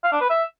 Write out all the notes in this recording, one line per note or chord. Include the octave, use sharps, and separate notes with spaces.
F5
D4
B4
E5